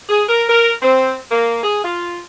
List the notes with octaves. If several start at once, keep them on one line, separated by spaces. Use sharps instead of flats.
G#4
A#4
A#4
C4
A#3
G#4
F4